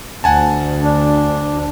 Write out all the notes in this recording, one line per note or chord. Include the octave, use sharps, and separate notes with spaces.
D2 F#5 G#5 A5
D4